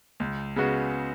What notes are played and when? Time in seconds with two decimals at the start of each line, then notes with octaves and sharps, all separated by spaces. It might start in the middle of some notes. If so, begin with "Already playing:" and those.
0.20 C#2
0.56 C#3 G#3 B3 F#4